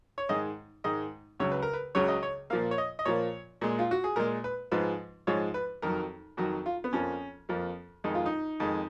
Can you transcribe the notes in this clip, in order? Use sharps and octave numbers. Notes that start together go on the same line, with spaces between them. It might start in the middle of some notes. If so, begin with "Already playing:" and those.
C#5
G#2 D#3 G#3 D#5
G#2 D#3 G#3 D#5
C#2 C#3 F#3 C#5
B4
A#4
B4
C#2 C#3 F#3 C#5
D#5
C#5
A#2 F3 A#3 F5
C#5
D#5
D#5
A#2 F3 A#3 C#5
A#2 G#3
F4
F#4
G#4
A#2 G#3 A#4
B4
G#2 F3 G#3 B4
G#2 F3 G#3 C#5
B4
F2 D#3 F#3 A#4
F2 D#3 F#3 F#4
F4
B3
F2 F3 A#3 C#4
F2 F3 A#3
F2 D#3 G#3 D#4
F4
D#4
F2 D#3 G#3